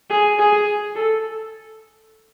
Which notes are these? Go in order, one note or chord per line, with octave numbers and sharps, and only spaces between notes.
G#4
G#4
A4